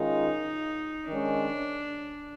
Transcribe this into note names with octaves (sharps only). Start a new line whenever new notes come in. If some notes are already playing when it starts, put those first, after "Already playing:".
Already playing: D#3 G#3 C#4 D#4 F4
D#3 G#3 C#4 D4